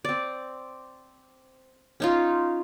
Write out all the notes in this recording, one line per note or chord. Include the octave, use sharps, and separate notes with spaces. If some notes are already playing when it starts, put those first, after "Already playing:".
C4 D5
C#4 D#4 F4